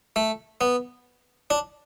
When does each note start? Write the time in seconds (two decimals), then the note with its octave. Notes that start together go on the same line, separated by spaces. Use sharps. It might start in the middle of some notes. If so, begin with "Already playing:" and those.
0.16 A3
0.61 B3
1.50 D4